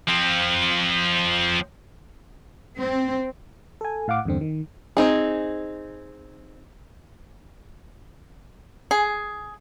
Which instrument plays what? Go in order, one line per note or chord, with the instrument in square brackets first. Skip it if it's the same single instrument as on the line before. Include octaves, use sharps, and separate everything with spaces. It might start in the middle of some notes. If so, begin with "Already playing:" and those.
[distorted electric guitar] F3 C4
[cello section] C4
[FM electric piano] A4 G#5
A2 F5 F#5 D6
E2 G2 D3 C4
D#3
[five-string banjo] C4 D#4 G#4
[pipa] G#4